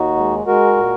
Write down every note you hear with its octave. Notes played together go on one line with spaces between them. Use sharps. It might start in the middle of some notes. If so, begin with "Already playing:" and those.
Already playing: D#2 D#4 F#4
G#3
G#3 F#4 A#4
A#2